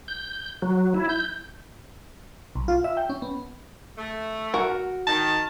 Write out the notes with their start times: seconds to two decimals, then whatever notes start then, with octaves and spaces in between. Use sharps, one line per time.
0.08 G6
0.62 F#3
0.94 E4
1.09 G6
2.55 B1
2.68 F4
2.84 E5
2.97 G5
3.09 C#4
3.22 B3
3.98 A3
4.54 F#4 A#4 F#5
5.07 D#3 A5